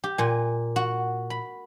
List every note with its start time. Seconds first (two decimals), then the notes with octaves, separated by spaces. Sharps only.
0.04 G4
0.18 A#2 G#5
0.76 F#4
1.30 B5